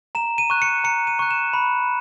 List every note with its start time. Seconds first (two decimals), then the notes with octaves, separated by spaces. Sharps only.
0.15 A#5 E7
0.38 D#7
0.50 C#6 F#6
0.62 C#7
0.84 A#5 C#7
1.07 D#7
1.19 C#6 F#6
1.31 E7
1.53 B5